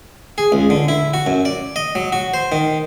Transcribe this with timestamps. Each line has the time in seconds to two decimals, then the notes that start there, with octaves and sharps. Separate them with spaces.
0.38 G#4
0.52 C#2
0.70 D3
0.88 E4
1.14 F#4
1.26 F#2
1.45 D5
1.76 D#5
1.95 F#3
2.12 F#4
2.34 C5
2.52 D#3